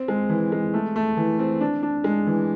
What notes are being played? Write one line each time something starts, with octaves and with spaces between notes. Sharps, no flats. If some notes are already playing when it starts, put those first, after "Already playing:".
Already playing: C4
G#3
E3
G#3
A3
A3
E3
C4
D4
D4
G#3
E3